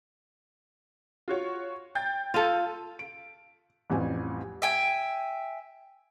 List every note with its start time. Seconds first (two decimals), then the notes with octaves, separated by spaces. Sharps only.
1.28 F4 F#4 C#5
1.95 G5 G6 A6
2.34 F4 A4 A6 D#7
2.99 D7
3.90 A1 F2 G3 G#5
4.62 E5 G5 G#5